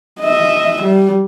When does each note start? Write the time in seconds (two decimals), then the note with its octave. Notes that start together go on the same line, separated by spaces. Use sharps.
0.21 D#5 E5
0.83 G3